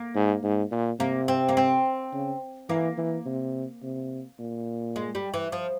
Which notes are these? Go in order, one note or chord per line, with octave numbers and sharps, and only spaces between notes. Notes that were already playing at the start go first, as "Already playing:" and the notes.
Already playing: A#3
G#2
G#2
A#2
C3 A#3
C4
A#3
C4
C#3
E3 A#3
E3
C3
C3
A#2
G#3
G3
E3
F3